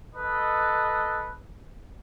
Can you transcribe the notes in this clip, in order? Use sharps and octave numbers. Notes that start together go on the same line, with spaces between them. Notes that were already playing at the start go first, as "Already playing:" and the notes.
A4 B4 D#5